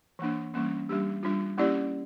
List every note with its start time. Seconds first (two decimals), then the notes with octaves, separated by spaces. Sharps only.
0.19 E3 A#3 D4
0.54 E3 G3 A#3 C#4
0.89 G3 A#3 D4 G4
1.23 G3 D4 F4
1.58 A#3 C#4 E4 G4 D5